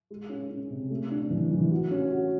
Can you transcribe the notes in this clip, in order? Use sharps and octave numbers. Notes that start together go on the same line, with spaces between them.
G#3
C#4
C#4
C3
A3
D4
E3
E3
F#4
C#4
F#4